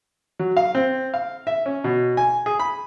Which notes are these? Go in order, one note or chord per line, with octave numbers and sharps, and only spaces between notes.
F#3
F5
C4
F5
E5
C#4
B2
G#5
G#4
B5